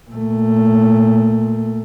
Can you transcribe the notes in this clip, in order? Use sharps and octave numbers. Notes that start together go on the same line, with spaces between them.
A#2 A3